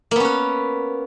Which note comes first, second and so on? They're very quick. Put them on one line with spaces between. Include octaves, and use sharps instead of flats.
A#3 B3 C#4 B4